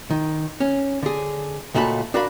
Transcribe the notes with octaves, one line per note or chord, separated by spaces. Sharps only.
D#3
C#4
D3 G#4
C#2 A#2 A3 F#4 A5 B5
D4 F#4 A#4 F5 B5